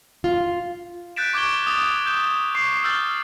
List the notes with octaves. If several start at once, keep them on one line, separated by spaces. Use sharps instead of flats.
F4
F#6 G6 A6 B6 D7 E7
C#6 D6 G#6 D7 G7
D#6 A6
G6 E7
C#6 C7
E6 F6 G6 A6